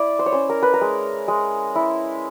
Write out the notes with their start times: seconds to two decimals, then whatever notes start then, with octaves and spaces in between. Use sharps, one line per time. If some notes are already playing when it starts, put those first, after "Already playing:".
Already playing: E4 D5
0.19 C5
0.26 C#5
0.32 C#4 C5
0.49 A#4
0.62 B4
0.74 A#4
0.81 G#3
1.28 G#3
1.76 E4